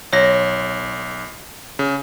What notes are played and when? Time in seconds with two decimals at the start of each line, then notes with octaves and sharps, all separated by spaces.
0.13 B1 C#5 A#6
1.79 C#3